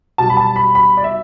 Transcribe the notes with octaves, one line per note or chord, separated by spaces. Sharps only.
B1 B2 G3 A5
B5
A5
B5
B5
D5
E5